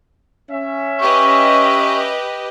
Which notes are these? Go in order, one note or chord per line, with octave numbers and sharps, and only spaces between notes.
C#4 E5
G4 B4 D#5 C#6